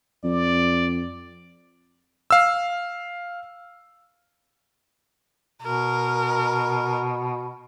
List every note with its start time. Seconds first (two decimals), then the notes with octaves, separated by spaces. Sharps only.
0.24 F2 D5
2.31 F5 E6
5.62 B2 A#4